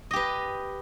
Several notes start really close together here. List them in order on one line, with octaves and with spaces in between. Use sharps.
D#5 G4 B4